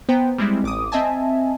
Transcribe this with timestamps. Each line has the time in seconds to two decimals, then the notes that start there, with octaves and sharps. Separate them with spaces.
0.09 B3 C5 G5 A#5
0.38 G3 G#3 C4 E4
0.63 A1 D6 D#6
0.92 C4 D#5 E5 G#5 A5